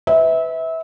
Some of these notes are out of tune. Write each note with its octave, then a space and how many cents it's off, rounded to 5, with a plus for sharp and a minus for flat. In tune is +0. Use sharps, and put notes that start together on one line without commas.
B4 +25 E5 -25